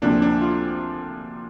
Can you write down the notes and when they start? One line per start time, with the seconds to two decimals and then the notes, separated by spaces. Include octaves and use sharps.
0.02 D2 C3 F3 A#3 D4
0.22 D4
0.42 F4